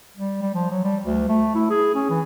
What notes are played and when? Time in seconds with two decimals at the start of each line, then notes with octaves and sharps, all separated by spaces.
0.17 G3
0.42 G3
0.55 F3
0.71 F#3
0.84 G3
1.06 D2
1.29 A3
1.55 E4
1.70 G#4
1.95 C#4
2.10 E3